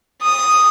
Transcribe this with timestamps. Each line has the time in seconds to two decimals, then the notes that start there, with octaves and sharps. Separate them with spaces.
0.21 D#6